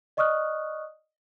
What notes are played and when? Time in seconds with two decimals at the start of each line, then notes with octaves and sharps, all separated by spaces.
0.17 D5 D#5 C#6 D#6 F6 F#6